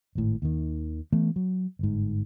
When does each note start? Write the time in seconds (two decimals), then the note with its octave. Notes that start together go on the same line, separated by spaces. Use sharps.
0.15 G#1 A2
0.42 D#2 D#3
1.13 E3 A3 B3
1.36 F#3
1.79 G1 G#2